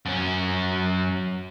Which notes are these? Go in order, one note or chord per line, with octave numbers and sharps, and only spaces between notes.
F#2 C#4